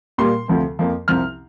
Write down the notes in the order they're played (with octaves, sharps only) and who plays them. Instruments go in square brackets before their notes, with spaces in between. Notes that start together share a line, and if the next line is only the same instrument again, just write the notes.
[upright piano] A#2 G3 A#3 C6
D2 C3 F3 C4
F2 F3 A#3
C2 C3 F3 C4 F6